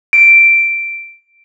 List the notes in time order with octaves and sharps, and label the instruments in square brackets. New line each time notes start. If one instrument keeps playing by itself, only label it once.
[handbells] D7